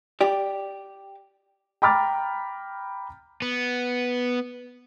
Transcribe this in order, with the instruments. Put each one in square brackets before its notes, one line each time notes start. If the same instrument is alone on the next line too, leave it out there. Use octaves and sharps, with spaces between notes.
[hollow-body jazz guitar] G4 D5
[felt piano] G5 A#5 B5 D6 F6 A6
[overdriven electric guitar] B3